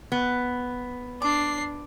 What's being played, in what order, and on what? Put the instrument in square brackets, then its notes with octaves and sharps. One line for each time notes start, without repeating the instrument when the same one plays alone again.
[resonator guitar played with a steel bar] B3
[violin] D4 C7 [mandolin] D6